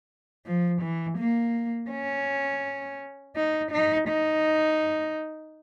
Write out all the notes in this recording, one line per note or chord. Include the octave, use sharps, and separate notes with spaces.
F3
E3
A#3
C#4
D#4
D#4
D#4